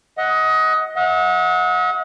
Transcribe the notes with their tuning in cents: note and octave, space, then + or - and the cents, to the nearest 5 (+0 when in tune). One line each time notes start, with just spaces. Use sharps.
D#5 +20 F#5 +0
D#5 +45 F#5 -30